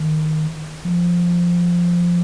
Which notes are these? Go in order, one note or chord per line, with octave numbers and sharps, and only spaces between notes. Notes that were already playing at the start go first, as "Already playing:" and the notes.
Already playing: D#3
F3